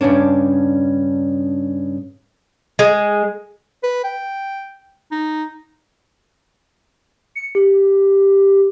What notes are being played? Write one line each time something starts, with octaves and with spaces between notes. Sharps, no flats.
G2 C#3 C#4 D4
G#3
B4
G5
D#4
C#7
G4